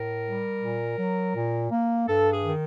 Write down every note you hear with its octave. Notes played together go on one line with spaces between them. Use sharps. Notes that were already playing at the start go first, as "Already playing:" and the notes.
Already playing: A2 A#4
G3
A#2
F#3
A#2
A#3
G2 A4
G#4
D#3